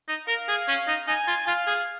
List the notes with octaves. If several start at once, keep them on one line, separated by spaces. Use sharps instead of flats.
D#4
A#4 F5
G#4
C#4
D#4
D#4 G#5
F4
F4 F5
G#4